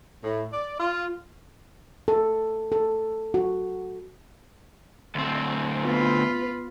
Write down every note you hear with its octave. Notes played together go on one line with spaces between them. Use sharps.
A2
D5
F4
A4
A4
F#4
D2 C4
B3 F4 B4